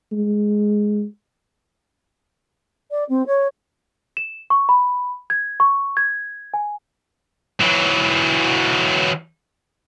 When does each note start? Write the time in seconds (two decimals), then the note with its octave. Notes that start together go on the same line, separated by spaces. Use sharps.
0.12 G#3
2.91 D5
3.09 C4
3.26 C#5
4.17 E7
4.50 C#6
4.69 B5
5.30 G#6
5.60 C#6
5.97 G#6
6.54 G#5
7.61 E3 F#3